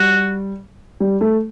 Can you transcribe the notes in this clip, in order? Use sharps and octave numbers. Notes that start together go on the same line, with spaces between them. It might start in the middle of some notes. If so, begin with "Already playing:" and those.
Already playing: G3 F#4
G3
A3